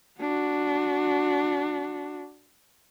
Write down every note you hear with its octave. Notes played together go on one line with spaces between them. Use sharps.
D4 F#4